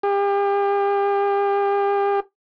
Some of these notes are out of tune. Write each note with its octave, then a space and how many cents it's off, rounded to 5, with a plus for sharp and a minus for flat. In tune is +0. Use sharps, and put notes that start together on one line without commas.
G4 +40